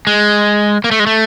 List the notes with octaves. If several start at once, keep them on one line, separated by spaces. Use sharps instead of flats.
G#3
A#3
A3
G#3
A3